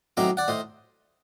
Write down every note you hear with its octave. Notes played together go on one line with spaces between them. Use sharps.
A2 F#3 C4 D#4 A#5 D6
D5 F#5
A2 C5 D#5